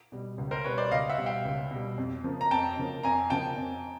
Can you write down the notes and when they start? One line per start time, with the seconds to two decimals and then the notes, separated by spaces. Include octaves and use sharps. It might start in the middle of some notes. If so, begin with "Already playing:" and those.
0.12 B2 G3
0.38 C#2
0.51 A#4 C5
0.64 B2 G3 B4 C#5
0.77 C5 D5
0.91 C#2 D#5 F5
1.10 E5 F#5
1.18 B2 G3
1.26 F5 G5
1.45 C#2
1.71 B2 G3
1.98 F2
2.24 C#3 F3 A#3
2.41 A#5
2.51 F2 G5 A5
2.77 C#3 F3 A#3
3.03 F2 G#5 A#5
3.30 C#3 F3 A#3 G5 A5
3.57 F2